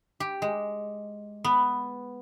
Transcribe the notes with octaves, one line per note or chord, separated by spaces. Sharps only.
G4
G#3
B3